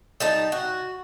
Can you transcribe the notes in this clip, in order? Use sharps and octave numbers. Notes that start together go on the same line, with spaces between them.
G3 D#4 A5
F#4